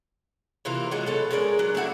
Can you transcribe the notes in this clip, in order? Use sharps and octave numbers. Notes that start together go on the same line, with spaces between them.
C3 E3 A#3 F4
F#3 G#3 F4 F#4
B2 A4 C#5
G#3 C#4 A#4 D5
F#3 D4
A3 D4 E4 F#4